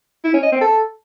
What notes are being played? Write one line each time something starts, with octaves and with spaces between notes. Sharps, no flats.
E4
C#4
D#5
C4
A4